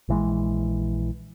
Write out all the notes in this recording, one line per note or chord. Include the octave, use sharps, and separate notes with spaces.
A#1 E3 G#3